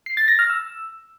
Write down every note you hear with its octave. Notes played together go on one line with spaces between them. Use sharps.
C7
A6
A#6
F6
E6